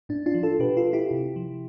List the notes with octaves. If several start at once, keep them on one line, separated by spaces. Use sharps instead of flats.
A2 D4
D4 F4
F3
F4 A4
B2 G4 B4
F4 A4
E4 G4
C3
F3